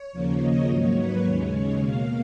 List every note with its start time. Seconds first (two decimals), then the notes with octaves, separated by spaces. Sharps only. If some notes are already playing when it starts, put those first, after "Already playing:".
Already playing: C#5
0.13 D#2 C#3 F3 A#3
0.41 D#5
0.69 G#2 F#3 A#3 C#5
0.97 B4
1.25 D#2 C#3 G#3 C#5
1.54 C#5
1.82 B2 A#3 F5